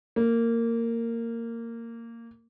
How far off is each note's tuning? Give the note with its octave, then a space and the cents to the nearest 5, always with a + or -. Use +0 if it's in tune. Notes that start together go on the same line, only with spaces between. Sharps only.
A#3 -15